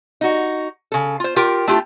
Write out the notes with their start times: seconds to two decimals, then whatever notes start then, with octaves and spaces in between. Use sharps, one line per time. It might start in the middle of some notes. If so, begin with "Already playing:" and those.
0.21 D#4 F#4
0.92 C#3 A4
1.20 F4 C5
1.36 F4 G4 A#4 G5
1.67 A3 D4 E4 F4 G4